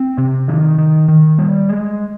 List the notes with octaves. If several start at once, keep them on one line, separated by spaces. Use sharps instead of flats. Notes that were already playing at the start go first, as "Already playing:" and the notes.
Already playing: C4
C3
D#3
D#3
D#3
G3
G#3